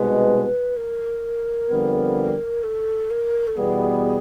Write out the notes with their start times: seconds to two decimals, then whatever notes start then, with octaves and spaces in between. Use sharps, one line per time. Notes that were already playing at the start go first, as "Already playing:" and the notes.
Already playing: C2 B2 G#3 B4
0.77 A#4
1.70 F2 D3 G3 B3
2.63 A4
3.11 A#4
3.47 A4
3.57 E2 B2 G3 B3 G#4